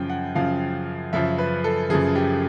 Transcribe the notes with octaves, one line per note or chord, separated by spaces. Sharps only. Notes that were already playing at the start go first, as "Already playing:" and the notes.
Already playing: F#2 C#3 F3 G5
F#5
F#2 C#3 F3 F5
F#2 C#3 F3 E5
B4
A4
F#2 C#3 F3 G#4
G4